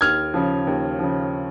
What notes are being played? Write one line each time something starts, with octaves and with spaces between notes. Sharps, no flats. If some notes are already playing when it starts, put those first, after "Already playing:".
D#2 F6 G#6
C#3 F3
D#2
C#3 F3